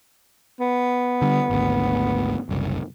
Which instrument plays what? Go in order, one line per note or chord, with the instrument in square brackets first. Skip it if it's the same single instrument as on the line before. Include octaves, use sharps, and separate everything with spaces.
[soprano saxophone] B3
[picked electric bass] D3 G3
G#1 D2
F#1 C2